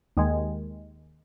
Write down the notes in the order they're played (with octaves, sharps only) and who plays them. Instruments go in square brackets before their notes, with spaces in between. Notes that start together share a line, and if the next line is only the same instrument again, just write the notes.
[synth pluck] D#2 D#3 G#3